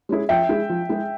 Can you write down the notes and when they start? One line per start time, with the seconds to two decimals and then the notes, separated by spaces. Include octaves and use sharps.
0.09 G#3 C#4 E4 G#4
0.29 F3 E5 G5
0.49 G#3 E4 G#4
0.69 F3
0.89 G#3 E4 G#4